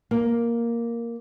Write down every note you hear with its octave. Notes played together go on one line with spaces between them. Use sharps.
A#3